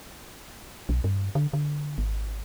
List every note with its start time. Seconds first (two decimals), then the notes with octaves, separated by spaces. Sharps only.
0.89 B1
1.04 G2
1.35 D3
1.53 D3
1.98 G#1